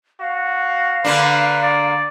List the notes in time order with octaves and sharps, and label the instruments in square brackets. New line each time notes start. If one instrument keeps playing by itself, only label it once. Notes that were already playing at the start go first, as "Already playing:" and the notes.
[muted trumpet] F#4 [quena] F5
[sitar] D3 A#3 D4 [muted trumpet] B4
[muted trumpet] D5